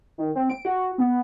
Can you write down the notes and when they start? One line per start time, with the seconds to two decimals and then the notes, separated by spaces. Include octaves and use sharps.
0.18 D#3
0.35 C4
0.50 D7
0.65 F#4
0.98 B3